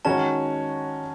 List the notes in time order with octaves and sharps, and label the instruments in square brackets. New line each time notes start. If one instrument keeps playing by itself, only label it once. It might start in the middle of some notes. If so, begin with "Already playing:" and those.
[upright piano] D#3 G#3 C#4 F#4 [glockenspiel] A5